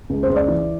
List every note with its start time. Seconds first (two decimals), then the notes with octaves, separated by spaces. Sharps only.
0.10 C#2
0.23 C5
0.30 C#2
0.36 D5
0.48 E3